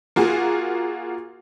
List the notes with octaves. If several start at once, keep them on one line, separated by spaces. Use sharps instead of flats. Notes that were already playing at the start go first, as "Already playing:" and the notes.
A#3 F4 F#4 G#4